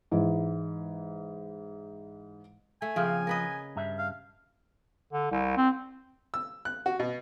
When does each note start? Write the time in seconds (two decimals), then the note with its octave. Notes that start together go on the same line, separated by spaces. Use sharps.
0.11 G#2 E3
2.82 A3 G#5
2.96 C#3 F3 A#3 C4
3.27 A#4 B4 D#5
3.76 G2 E5
3.99 F5
5.13 D3
5.31 C2
5.57 C4
6.34 E6
6.65 F#6
6.86 F#4
7.00 B2